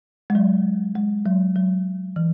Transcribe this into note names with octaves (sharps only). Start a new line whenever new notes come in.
G#3
F#3
G#3
F#3
F#3
E3